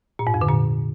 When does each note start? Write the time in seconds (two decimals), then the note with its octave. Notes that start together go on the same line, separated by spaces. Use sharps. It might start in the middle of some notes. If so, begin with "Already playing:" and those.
0.19 A#2
0.27 G#2
0.34 F2
0.41 D3
0.49 A#2